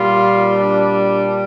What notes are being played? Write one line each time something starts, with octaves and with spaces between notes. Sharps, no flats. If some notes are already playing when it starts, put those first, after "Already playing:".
Already playing: A#2 G3 F4
D4